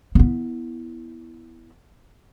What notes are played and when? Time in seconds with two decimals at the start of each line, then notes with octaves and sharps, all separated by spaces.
0.15 B3 E4